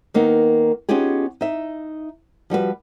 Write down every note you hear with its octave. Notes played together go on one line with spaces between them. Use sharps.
D#3 A#3 B3 D#4
B3 C#4 D#4 F4 G4 G#4
D#4 E5
F3 G3 F#4 B4